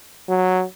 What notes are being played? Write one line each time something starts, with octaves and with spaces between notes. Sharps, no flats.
F#3